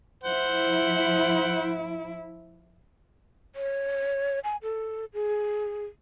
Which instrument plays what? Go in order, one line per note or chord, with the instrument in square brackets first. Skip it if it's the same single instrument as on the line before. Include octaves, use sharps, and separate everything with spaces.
[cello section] F3 E4 [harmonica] C5 F#5
[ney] C#5
G#5
A4
G#4